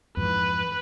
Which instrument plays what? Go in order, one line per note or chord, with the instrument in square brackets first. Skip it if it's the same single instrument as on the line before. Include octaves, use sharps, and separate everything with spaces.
[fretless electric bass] F2 G#2 E3 [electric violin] B4